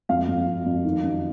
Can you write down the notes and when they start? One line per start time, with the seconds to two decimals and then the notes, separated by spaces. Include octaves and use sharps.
0.09 F2 F5
0.28 F2
0.47 F2
0.66 F2
0.85 D#3
1.03 F#2